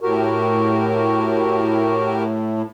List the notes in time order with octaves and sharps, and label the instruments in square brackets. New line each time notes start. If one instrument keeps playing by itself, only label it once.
[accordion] A2 [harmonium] F#4 G4 A#4